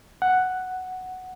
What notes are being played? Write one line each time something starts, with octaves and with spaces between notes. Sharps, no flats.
F#5